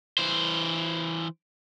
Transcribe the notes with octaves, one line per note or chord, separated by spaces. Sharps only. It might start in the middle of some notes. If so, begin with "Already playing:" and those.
E3 C5